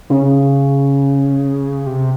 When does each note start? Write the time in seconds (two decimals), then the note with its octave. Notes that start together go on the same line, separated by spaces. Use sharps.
0.10 C#3
1.86 C3